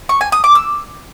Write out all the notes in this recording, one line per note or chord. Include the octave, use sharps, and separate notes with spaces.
C#6
G#5
D#6
D6
E6